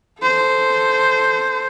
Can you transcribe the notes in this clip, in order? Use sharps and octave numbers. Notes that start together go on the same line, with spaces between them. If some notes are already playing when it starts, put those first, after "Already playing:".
A4 C5